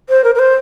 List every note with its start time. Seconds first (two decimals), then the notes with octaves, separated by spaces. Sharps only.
0.09 C5
0.24 A#4
0.35 A#4
0.39 C5